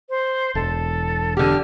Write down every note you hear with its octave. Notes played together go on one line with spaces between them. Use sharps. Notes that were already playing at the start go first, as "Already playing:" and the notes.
C5
E1 A4
D3 G4 F6